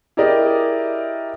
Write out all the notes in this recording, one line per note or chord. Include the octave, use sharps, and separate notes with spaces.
E4 G4 G#4 A#4 D5 D#5